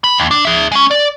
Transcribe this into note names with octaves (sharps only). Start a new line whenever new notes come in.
B5
D#2
D4
G#4 E5
G#3 C#4
D5